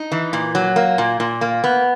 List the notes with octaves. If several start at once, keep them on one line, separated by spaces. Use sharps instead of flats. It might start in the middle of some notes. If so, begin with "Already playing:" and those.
Already playing: D#4
E3
A#2
F#3
A#3
A#2
A#2
A#3
B3